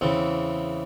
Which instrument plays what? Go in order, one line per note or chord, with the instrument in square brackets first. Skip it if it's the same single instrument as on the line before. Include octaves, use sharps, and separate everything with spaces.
[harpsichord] E2 C#3 E3 C4